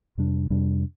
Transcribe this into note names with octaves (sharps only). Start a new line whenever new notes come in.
F2 C3 G3 D4
F2 C3 G3 D4